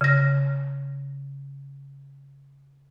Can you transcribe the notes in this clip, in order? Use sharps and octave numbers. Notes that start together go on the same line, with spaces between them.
C#3 A#6